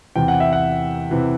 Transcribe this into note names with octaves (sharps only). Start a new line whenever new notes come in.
E2 C3 E3 G5
F#5
E5
F#5
C3 E3